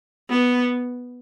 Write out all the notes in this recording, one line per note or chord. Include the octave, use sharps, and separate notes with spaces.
B3